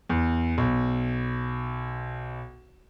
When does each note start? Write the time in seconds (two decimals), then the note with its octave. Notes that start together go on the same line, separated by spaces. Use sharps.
0.10 E2
0.58 B1